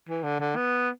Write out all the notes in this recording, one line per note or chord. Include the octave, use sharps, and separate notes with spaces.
E3
D3
D3
B3